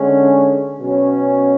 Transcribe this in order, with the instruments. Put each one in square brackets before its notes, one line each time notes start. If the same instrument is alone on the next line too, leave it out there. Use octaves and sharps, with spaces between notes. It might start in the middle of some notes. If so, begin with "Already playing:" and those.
Already playing: [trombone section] D3 G#3 C#4
B2 F#3 C#4